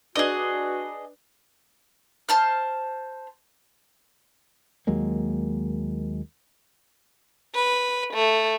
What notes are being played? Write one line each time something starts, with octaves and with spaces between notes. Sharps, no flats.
D4 F#4 G#4 B4 D5 D#5
C5 A5 F6
D#2 F#3 G#3 A#3
B4
A3